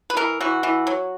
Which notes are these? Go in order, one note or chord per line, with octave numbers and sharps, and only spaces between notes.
B4
E3 A#4
E3 F#4
E3
F#3